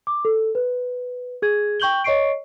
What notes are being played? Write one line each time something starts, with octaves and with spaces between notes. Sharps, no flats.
D6
A4
B4
G#4 G#6
G5 C#6 G6 F#7 G7
C#5 D#5 C#6 C7 D7